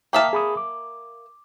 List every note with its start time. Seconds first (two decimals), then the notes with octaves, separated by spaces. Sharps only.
0.13 A#3 E5 G5 A5 D#6 F6
0.33 G#4 B5 D#6
0.57 D6